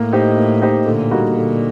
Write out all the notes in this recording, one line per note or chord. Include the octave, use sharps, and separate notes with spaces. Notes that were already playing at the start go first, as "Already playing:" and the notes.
Already playing: A2 A#3
D#4 G4 C5 D#5
A#3
D#4 G4 C5 D#5
A#2 D3
G3 A#3 D#4 F#4
A#2 D3